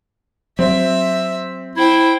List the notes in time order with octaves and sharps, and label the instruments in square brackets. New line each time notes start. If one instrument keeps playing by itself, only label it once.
[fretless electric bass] F#3 [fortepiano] C4 [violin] E5
[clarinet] E4 [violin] C5 G5